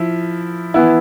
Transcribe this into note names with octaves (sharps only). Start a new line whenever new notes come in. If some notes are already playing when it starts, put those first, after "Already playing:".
Already playing: F3 E4
E3 B3 E4